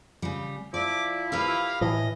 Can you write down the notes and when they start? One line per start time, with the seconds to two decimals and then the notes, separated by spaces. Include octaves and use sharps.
0.22 C#3 G3
0.74 F3 E4 D5 D6
1.32 G4 A#4 B4 F5
1.81 A2 E3 D#5